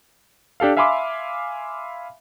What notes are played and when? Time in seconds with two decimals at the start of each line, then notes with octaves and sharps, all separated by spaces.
0.60 D4 G4 A4 F5
0.77 E5 F5 G#5 B5 C6 D6